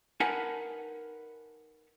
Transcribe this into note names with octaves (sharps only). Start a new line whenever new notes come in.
D#4 A#4 B4 F#5 G#5 A5